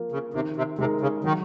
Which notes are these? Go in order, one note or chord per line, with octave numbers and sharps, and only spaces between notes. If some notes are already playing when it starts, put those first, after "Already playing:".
Already playing: F3 A#3 F4 A#4
C#3
C3 D#3
C3
C3 G#3 D#4 A#4
C#3
D#3 F#3